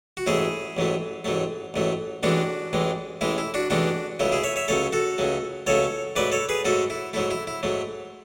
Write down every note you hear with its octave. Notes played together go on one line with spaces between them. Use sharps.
F#4
A1 G#2 F#3 A3 E4 G#4
A1 G#2 F#3 A3
A1 G#2 F#3 A3
A1 G#2 F#3 A3
A1 A2 E3 G#3 D4 F#4
A1 A2 E3 G#3
A1 A2 E3 G#3 E4
E4
D4 F#4
A1 A2 E3 G#3 D4 F#4
C#2 C#3 F#3 A3 E4
E4 G#4
C#5 E5
C#5 E5
C#2 C#3 F#3 A3 A4 C#5
F#4 A4
C#2 C#3 F#3 A3
C#2 C#3 F#3 A3 A4 C#5
G#2 F#3 A3 B4 D5
A4 C#5
G#4 B4
G#2 F#3 A3 F#4 A4
E4
G#2 F#3 A3 E4
E4
E4
G#2 F#3 A3